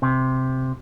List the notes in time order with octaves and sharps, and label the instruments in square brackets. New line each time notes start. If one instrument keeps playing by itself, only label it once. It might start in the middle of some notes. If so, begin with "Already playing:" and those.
[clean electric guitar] C3